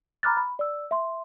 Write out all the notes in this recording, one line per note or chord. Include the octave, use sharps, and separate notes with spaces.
A#5 B5 D6 F6 F#6 A6
B5
D5 E6
E5 C6